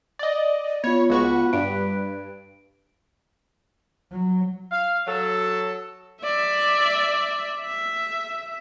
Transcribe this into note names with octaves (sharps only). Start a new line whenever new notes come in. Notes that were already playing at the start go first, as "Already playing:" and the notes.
D5 D#5
B3 F4 C#5 B5
C#2 F#4 B4 C#6
G2 D7
F#3
F5
F#3 A4
D5 E5
E5